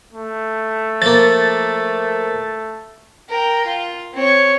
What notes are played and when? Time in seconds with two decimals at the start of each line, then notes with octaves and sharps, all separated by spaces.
0.13 A3
1.02 F3 A#3 A6
3.29 A#4 G5
3.66 F4
4.13 C4 C#5